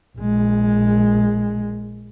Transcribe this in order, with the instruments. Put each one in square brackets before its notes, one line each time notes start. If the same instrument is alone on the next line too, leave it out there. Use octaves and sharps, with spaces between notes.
[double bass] A#1 G#3